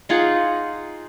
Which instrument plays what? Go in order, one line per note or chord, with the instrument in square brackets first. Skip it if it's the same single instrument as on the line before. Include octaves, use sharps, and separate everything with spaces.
[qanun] D#4 F4 G#4 F#5